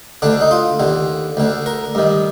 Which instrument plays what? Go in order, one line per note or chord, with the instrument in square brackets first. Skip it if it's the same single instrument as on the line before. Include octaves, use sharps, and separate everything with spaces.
[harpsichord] D2 D3 D4
D#4
F4
D#2 D3
D2 D3
A#4
G2 D#3